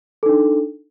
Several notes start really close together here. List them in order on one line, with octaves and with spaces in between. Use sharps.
A4 D#4 D4